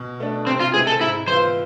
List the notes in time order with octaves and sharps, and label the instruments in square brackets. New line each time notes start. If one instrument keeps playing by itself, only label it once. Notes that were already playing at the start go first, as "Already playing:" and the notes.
Already playing: [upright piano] B2
A3 D4
[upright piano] C3 [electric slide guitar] C4
[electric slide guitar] F4
[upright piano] G#3 C4 E4 [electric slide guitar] G#4
[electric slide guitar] A4
[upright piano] G#2 [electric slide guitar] E4
[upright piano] E3 B3 F4 [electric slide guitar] C5